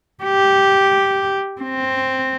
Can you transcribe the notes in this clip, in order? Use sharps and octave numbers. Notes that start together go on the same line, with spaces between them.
G4
C4